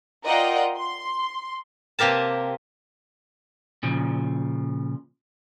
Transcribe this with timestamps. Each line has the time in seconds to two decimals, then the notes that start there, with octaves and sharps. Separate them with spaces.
0.25 F4 A#4 D5 D#5 F#5 G5
0.76 C6
1.99 C3 A#3 G4 A#4 A5
3.83 A#2 C#3 F3